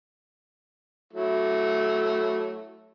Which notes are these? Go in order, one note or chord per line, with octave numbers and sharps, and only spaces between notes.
F#3 A3 E4